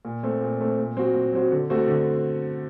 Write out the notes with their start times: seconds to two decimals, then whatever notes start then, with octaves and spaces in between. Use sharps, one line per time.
0.05 A#2
0.23 A3 C4
0.42 A#2
0.60 A3 C4
0.79 A#2
0.96 F#3 C4 F#4
1.15 A#2
1.33 F#3 C4 F#4
1.51 D3
1.70 A3 C4 F#4
1.88 D3